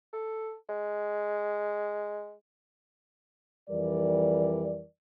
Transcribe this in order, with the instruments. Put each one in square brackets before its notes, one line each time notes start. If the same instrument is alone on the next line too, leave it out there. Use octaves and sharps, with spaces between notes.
[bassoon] A4
G#3
[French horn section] F2 E3 G3 A#4 D5